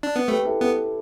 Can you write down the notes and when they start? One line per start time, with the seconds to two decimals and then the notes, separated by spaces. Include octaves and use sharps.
0.03 D4
0.16 B3
0.28 A3 G4 B4
0.45 E4 A4
0.61 B3 E4 A4